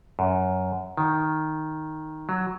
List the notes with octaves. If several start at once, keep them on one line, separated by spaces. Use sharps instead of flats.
F#2
D#3
F#3